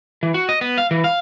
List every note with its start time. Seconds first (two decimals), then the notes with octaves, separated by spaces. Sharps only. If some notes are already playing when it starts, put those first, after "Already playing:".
0.23 E3
0.34 F#4
0.49 D#5
0.61 B3
0.78 F5
0.91 E3
1.04 F5